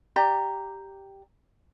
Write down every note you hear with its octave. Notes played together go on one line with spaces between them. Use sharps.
G4 D5 A#5